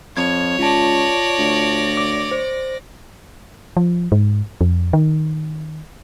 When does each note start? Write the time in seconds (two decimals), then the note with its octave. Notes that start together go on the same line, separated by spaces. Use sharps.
0.17 F2 C#5 G#6
0.59 C#2 F4 D5 A5 A#6
1.38 D2
1.97 D6
2.31 C5
3.77 F3
4.12 G#2
4.61 F2
4.93 D#3